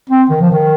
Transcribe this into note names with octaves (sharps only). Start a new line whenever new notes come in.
C4
D#3
F3
D#3